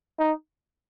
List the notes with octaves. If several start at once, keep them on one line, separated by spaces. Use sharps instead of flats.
D#4